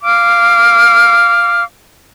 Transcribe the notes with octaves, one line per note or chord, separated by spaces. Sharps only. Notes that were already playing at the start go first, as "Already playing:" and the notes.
F5 D6 F6